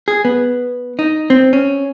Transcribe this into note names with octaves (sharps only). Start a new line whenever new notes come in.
G#4
B3
D#4
C4
C#4